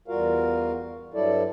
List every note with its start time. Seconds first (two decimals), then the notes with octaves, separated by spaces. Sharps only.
0.08 E2 G3 F4 F#4 A#4 F5
1.14 G2 F#3 G3 E4 A4 D5